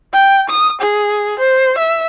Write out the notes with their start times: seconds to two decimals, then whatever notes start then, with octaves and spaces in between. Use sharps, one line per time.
0.13 G5
0.49 D#6
0.81 G#4
1.39 C5
1.78 E5